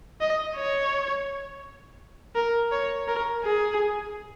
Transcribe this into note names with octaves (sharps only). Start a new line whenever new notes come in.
D#5
C#5
A#4
C#5
A#4
G#4